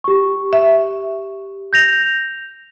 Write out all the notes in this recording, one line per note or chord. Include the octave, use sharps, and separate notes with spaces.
G4 C#6
E5
G6 A#6 F7